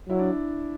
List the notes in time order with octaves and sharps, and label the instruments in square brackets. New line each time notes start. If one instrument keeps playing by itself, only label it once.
[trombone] F#3 [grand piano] E4
[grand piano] D4